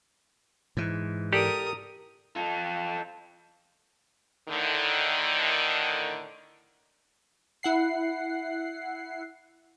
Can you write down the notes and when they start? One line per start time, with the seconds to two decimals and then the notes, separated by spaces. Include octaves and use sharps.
0.77 G#2 E3
1.33 G4 A4 A#4 D5 D#6
2.36 F4 A4
4.49 A2 D3 D#3
7.63 E4 F#5 C7